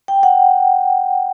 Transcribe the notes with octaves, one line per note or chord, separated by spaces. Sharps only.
G5
F#5